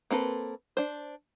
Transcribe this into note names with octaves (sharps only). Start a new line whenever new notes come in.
A#3 C4 A4 B4
D4 C5